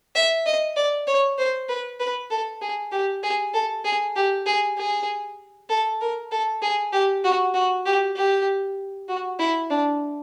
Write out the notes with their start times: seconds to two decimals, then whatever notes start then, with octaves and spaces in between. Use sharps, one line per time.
0.16 E5
0.46 D#5
0.77 D5
1.08 C#5
1.38 C5
1.69 B4
2.00 B4
2.31 A4
2.62 G#4
2.92 G4
3.23 G#4
3.54 A4
3.85 G#4
4.16 G4
4.47 G#4
4.78 G#4
5.70 A4
6.01 A#4
6.32 A4
6.62 G#4
6.93 G4
7.24 F#4
7.54 F#4
7.86 G4
8.16 G4
9.09 F#4
9.39 E4
9.70 D4